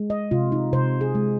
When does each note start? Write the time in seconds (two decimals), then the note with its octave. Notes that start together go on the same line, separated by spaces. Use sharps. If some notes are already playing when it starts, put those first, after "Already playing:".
Already playing: G#3
0.10 D#5
0.31 C3 F4
0.52 D#4
0.73 C3 C5
1.01 G#4
1.15 G#3